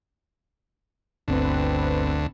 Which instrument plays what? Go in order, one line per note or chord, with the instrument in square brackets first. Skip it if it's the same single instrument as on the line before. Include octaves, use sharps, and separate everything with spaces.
[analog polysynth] G1 C4 B4 [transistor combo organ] D2